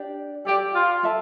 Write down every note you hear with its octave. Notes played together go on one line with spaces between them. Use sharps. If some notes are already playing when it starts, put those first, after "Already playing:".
Already playing: D4 G4 D5
G4 A4 D5 G5
F4
F4 A4 E5 A5